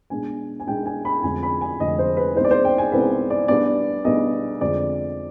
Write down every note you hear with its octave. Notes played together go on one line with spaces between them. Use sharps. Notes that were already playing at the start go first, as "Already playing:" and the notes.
B1 B2 G#3 D4 G#5
G#5
B1 B2 G#3 D4 G5
G#5
B5
F1 F2 D3 F3 G#3 G#5
B5
G#5
F1 F2 D3 F3 G#3 D#5
C5
B4
C2 B2 G#3 C4 D#4 C5
D5
C5
G5
G#5
C2 B2 G#3 C4 D#4 B4
D5
B1 B2 G3 B3 D4 D5
B1 B2 G3 B3 D4 D#5
F2 D3 G#3 C4 D5